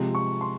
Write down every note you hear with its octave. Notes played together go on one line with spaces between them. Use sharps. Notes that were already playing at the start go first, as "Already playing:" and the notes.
Already playing: C3 F3 G#3
C#6
C6